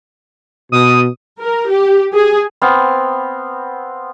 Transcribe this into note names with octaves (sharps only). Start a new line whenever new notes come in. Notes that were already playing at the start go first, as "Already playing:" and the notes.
B2 D#6
A#4
G4
G#4
B3 C4 F5